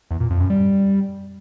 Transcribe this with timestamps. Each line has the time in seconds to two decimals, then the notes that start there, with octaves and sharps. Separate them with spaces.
0.11 E2
0.20 A#2
0.30 F2
0.40 F#2
0.50 G3